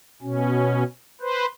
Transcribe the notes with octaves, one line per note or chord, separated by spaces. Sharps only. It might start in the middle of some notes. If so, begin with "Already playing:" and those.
B2 C#4
B4 C5